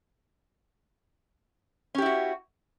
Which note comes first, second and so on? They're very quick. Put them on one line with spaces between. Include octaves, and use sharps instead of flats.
C#4 G4 E4 F#4